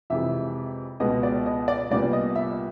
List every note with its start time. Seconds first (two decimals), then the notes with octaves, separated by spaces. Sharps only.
0.10 F2 C3 E3 G#3 E5
1.00 C#2 B2 G#3 B3 D#5
1.23 D5
1.46 D#5
1.68 D5
1.91 C2 A#2 G3 B3 D5
2.13 D#5
2.36 E5